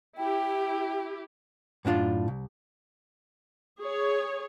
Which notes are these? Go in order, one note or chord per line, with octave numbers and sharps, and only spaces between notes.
E4 G4 G5
F#2 A2 D4 F4
C2
G#4 C#5